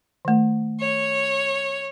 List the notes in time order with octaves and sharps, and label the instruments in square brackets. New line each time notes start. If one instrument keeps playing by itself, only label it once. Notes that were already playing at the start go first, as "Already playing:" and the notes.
[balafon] D#3 A3
[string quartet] C#5